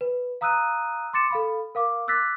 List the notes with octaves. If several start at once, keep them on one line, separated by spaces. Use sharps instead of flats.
B4
F5 A#5 D#6 E6 F#6 D#7
C6 D6 A6 C#7 E7
A4 F5 B5
A#4 F5 D6
D6 E6 F#6 A6 B6